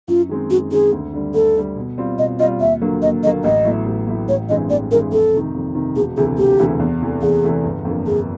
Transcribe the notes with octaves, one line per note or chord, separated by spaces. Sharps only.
F#2 F4
D#3 G#3 C4
F#2 F#4
D#3 G#3 C4 G#4
D2
D3 G3
D2 A4
D3 G3
B2
G3 C4 F4
B2 D#5
G3 C4 F4 D#5
D#2 E5
D3 F#3 A#3
D#2 D#5
D3 F#3 A#3 D#5
A1 D#5
A2 F#3 B3 E4
A1
A2 F#3 B3 E4
A1 C#5
G2 E3 G#3 C4 D#5
A1 D5
G2 E3 G#3 C4 A#4
F2 A4
C3 D#3
F2
C3 D#3
E1 G#4
D2 C3 E3 A3 G#4
E1 G4
D2 C3 E3 A3
E2
C3 E3 A3
E2 G#4
C3 E3 A3
G1
F2 D3 F3 A#3
G1 G#4